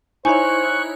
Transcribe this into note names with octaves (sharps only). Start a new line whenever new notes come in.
D#4 E4 C5 C#5 G#5 C#6 F#6